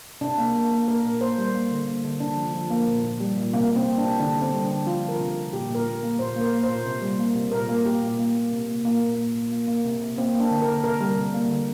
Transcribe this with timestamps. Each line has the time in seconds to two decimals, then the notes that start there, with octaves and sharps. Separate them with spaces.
0.21 C3 D4
0.38 A#3
0.54 A#3
0.72 A#3
0.88 A#3 A#4
1.05 A#2
1.21 A#3 C5
1.38 G3
1.54 A#3
1.71 D3
1.87 A#3
2.04 D3
2.20 C3 D4
2.37 F3
2.54 F3
2.70 A#3
2.87 A#2
3.04 A#2
3.20 G3
3.37 A#2
3.54 C3 A#3
3.70 A#3
3.76 C4
3.86 A#3
3.98 D4
4.04 C3
4.20 D3 D4
4.37 D3
4.42 C4
4.53 G3
4.64 D4
4.70 D3
4.86 F3 F4
5.03 C3
5.09 A#4
5.20 C3
5.37 C3
5.53 A#2 G4
5.69 A#2
5.75 A#4
5.86 A#2
6.03 A#3
6.19 A#2 C5
6.36 A#3
6.41 A#4
6.53 A#3
6.63 C5
6.69 A#2
6.85 C3
7.02 G3
7.19 A#3
7.36 C3
7.52 A#2 A#4
7.69 A#3
7.85 A#3 G4
8.02 A#2
8.19 A#3
8.35 A#3
8.52 C3
8.68 A#3
8.85 A#2 A#3
9.01 A#2
9.18 A#2
9.35 A#2
9.52 A#3
9.68 A#3
9.85 C3
10.01 C3
10.18 A#3 C4
10.34 A#3
10.40 D4
10.51 D3
10.62 A#4
10.68 D3
10.84 C3 A#4
11.00 G3
11.18 C3
11.34 A#3
11.51 D3